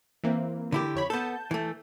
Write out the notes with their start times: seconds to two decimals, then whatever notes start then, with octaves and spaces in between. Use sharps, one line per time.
0.24 E3 A#3 C4
0.72 D3 E4 G4
0.95 F2 C#5 B5
1.10 B3 A4 A5 G6
1.51 E3 A3